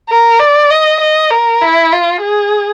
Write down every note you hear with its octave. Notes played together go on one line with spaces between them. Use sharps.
A#4
D5
D#5
D#5
A#4
E4
F4
G#4